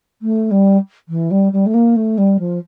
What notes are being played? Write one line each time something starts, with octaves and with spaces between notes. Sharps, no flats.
A3
G3
E3
G3
G3
A3
A#3
A3
G3
F3